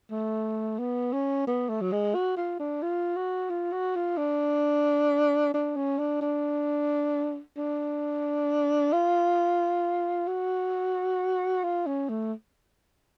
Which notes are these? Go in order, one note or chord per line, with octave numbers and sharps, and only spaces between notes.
A3
B3
C#4
B3
A3
F#3
G#3
F#4
F4
D4
F4
F#4
F4
F#4
F4
D4
D4
C#4
D4
D4
D4
F4
F#4
F4
C#4
A3